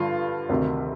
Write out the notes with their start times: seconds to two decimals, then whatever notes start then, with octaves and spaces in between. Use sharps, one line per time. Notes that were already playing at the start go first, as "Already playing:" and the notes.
Already playing: G2 D3 F3 F4
0.49 D2 C3 D#3